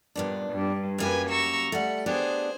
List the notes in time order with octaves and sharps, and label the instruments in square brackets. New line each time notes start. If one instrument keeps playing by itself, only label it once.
[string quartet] G2 [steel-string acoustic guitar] A#2 B3 D4
[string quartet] G2
[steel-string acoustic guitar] F#2 A#3 G4 [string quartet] B4 G#5 G#6
[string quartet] A#5 C#6 E6
[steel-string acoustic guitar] G3 A3 [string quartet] F#5
[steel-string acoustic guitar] B3 D4 G4 [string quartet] G#4 C5